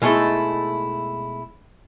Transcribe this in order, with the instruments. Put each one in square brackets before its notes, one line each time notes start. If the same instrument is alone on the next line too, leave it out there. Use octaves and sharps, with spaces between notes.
[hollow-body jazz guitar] B2 G#3 A3 D#4 E4 A4